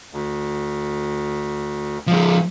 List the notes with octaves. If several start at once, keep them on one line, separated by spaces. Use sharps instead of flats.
D2
F3 G#3